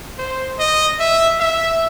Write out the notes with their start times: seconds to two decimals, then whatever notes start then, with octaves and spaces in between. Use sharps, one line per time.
0.18 C5
0.59 D#5
0.99 E5
1.40 E5